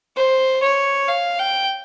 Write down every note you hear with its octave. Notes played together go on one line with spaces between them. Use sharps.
C5
C#5
F5
G5